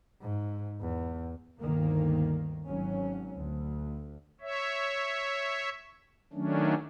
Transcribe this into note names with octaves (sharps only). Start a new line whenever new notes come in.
G#2
E2
G1 D2 D#3 A#3
G#1 F#3 C#4
D2
C#5 E5
D#3 F#3 A3 C#4 D4